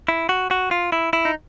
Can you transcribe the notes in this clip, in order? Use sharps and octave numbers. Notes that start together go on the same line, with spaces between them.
E4
F#4
F#4
F4
E4
E4
D#4